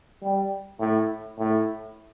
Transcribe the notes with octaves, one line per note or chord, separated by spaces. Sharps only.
G3
A2
A2